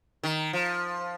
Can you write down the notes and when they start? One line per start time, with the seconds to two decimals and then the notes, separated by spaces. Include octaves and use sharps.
0.24 D#3
0.53 F3